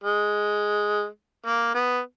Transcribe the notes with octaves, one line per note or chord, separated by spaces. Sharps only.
G#3
A#3
B3